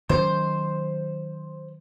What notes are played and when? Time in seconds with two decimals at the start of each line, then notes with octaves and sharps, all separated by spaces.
0.10 D#3 F#3 C#4 C5